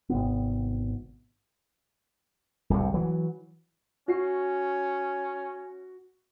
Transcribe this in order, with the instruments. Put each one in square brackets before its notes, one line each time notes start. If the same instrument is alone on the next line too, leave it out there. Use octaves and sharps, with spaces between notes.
[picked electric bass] G#1 C3 B3
[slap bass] D1 C2 F#2 C3
E3 F#3
[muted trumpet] C#4 [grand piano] F#4 C7